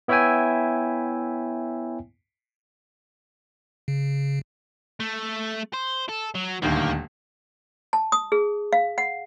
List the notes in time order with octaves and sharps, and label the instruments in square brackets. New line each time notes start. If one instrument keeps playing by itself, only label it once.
[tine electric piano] B3 E4 C#5 E5 G5 G#5
[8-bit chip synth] C#3
[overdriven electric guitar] A3
C5
A4
F#3
[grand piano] D#1 D2 D#3 [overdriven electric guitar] A#3
[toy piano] A5
D#6
G#4
F5
F#5